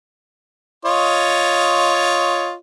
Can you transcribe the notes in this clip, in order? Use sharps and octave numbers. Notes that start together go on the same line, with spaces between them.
F4 C#5 D#5